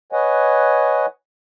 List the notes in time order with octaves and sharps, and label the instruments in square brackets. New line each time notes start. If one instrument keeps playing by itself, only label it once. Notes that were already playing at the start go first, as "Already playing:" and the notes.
[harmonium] B4 C#5 D#5 F#5 G#5